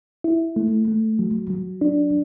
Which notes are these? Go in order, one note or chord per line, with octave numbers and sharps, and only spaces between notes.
E4
A3
A3
F#3
F#3
D4